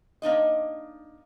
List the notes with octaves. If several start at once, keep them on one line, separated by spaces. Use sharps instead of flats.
A#3 D4 D#4 D#5